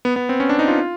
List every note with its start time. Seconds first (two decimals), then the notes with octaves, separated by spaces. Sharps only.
0.05 B3
0.16 B3
0.29 C4
0.40 C#4
0.49 D4
0.59 D#4
0.68 F4